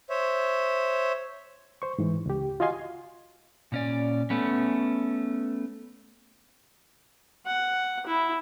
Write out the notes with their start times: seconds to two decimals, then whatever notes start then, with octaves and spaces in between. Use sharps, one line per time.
0.10 C5 C#5 E5
1.82 C5 C#6
1.98 G#2 E3
2.26 C#2 G4
2.60 F4 F#4 D#5 F5 G#5 C6
3.72 A#2 C#4 D5
4.30 A3 B3 C#4
7.46 F#5
8.06 E4